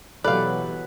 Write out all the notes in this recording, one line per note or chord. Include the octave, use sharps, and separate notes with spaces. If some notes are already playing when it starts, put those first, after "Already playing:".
B2 E3 F#3 G4 A4 B4 D5 F5